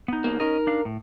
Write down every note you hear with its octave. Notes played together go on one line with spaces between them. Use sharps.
B3 D#4
E2 A#3
C#4 D#4 A#4 D#5
D4 F5
A2